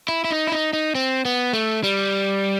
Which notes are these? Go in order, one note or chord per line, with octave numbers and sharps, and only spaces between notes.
E4
E4
D#4
E4
D#4
D#4
C4
B3
A3
G3